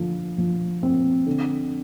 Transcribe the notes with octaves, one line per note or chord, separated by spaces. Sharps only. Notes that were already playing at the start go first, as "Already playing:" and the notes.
Already playing: D3 F3
F3
C4
D3